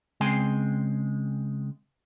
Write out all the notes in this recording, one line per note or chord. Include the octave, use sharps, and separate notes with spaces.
C#3 G#3 C4 G5 G#5 C6